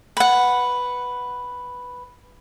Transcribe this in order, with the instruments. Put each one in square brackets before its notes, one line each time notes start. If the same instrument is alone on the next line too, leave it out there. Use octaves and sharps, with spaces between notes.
[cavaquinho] B4 F#5